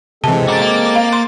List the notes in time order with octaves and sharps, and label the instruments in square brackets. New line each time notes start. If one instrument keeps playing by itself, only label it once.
[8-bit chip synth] C3 E3 [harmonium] G#3 C4 A4 [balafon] A5
[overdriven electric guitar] F#4 A#4 [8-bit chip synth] D6 A6
[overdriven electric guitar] A#3
[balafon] F5
C6